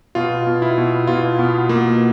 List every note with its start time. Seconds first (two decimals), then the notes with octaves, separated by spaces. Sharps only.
0.15 B2 F4
0.47 B2
0.62 E4
0.78 B2
1.07 B2 F4
1.39 B2 B3
1.69 B2 A#3